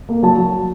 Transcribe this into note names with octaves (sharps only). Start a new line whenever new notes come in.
A#3
F#3 A5
F#3